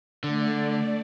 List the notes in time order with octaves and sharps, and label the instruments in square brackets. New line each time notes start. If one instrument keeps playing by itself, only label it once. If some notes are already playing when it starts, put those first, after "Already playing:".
[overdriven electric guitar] D3 [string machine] A3 D5